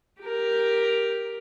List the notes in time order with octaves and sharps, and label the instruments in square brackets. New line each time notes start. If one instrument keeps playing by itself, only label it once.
[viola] G4 A#4